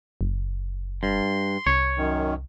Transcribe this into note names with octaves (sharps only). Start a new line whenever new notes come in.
F#1
G2 C6
C2 C#5
F#2 D#3